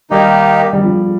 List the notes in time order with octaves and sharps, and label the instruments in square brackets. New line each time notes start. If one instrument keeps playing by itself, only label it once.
[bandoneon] D#3 A#3 D#4 G4 [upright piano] G3
[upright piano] G3
F3